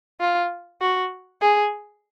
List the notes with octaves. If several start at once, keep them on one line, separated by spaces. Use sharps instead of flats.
F4
F#4
G#4